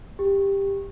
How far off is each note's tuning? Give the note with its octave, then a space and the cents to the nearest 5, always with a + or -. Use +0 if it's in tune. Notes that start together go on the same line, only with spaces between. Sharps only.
G4 +10